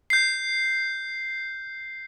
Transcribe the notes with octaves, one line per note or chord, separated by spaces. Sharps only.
G6 C7